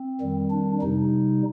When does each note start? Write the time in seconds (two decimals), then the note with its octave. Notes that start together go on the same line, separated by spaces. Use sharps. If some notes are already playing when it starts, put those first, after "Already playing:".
Already playing: C4
0.21 F2 D#3 G3
0.51 D4
0.81 C3 G3 D#4